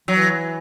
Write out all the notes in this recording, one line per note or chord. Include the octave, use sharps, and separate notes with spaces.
E3 F#3